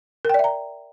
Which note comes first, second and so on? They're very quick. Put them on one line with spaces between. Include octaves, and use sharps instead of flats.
A#4 G5 D5 E5 A#5